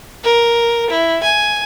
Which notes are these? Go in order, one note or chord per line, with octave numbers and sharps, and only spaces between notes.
A#4
E4
G#5